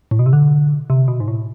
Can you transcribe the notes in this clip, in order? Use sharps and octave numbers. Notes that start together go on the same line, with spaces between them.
A2
B2
C3
D3
C3
B2
G#2
A2